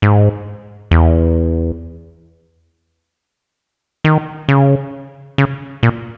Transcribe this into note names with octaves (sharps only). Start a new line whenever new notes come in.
G#2
E2
D#3
C#3
C#3
A#2